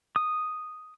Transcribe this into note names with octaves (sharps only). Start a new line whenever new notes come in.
D#6